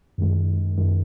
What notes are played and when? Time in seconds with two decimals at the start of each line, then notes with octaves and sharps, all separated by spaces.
0.18 F#2 D#3 G#3
0.77 F#2 D#3 G#3